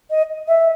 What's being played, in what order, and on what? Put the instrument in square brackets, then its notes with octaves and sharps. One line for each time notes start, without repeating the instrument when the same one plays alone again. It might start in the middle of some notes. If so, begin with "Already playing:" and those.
[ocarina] D#5
E5